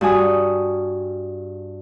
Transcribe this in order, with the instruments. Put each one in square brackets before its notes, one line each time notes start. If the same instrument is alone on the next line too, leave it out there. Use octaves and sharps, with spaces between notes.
[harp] G2 F#4 G#5 D#6